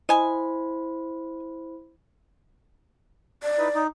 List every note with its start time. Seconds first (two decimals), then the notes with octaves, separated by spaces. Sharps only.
0.09 E4 C5 D#5 G#5 B5
3.43 D5
3.58 D#4 E4 B4
3.75 D#4